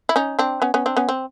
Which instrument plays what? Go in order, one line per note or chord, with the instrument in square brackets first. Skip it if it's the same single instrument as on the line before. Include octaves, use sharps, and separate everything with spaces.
[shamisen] E4
C#4 D#4
C4 D4
B3 C#4
B3 C#4
C4 D4
B3 C#4
C4